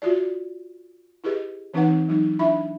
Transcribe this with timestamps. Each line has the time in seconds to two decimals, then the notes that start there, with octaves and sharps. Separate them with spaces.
0.02 F4 F#4 D5
1.24 E4 G4 G#4 B4 D#5
1.74 E3 C4 D#4 B4 F#5
2.09 F#3 D#4
2.39 D4 E4 E5 B5